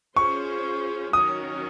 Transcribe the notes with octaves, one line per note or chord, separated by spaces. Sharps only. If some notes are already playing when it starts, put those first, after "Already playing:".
C#4 F4 G#4 C5 C#6
D#3 F#3 C#4 F#4 A#4 D#6